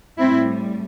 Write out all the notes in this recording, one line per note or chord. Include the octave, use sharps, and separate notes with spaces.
A2 G3 C4 E4